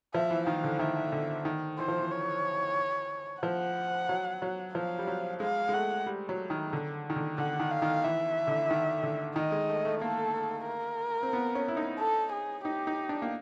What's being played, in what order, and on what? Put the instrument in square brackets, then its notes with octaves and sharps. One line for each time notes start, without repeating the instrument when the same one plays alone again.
[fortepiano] F3 [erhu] E5
[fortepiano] E3
[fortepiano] D#3 [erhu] F5
[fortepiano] D3
[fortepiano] D#3 [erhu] E5
[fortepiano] D3
D#3
[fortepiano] E3 [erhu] C5
[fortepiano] F3
E3
[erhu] C#5
[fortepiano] F3 [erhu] F#5
[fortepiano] F#3
F#3
[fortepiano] F3 [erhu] F5
[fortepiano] G3
F#3
[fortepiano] G#3 [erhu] F5
[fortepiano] G#3
[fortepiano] A3 [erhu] F#5
[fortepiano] G3
F#3
D#3
D3
D#3
D3
[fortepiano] D3 [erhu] F#5
[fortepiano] D#3
[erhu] F5
[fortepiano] D#3
[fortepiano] E3 [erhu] E5
[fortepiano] D3
D#3
D3
[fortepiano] D#3 [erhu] D#5
[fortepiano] G#3
A3
A3
[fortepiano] A#3 [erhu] A4
[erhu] A#4
[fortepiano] C4
B3
C#4
E4
D#4
[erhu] A4
G#4
[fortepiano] D#4 [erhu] G4
[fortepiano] D#4
D4
A#3